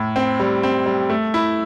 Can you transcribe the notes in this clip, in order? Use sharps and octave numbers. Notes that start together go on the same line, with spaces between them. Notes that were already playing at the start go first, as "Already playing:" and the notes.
Already playing: A2
C4
G3
C4
G3
A3
E4